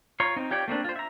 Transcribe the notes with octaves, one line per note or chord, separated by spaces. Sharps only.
F4 C#5 A#5 C6
C4 D#4
F4 G4 C#5 D5 G5
A3 A#3 C4 D4
F4 C5
E5 A#5